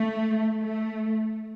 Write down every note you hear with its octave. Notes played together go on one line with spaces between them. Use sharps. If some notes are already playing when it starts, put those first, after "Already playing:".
Already playing: A3
A3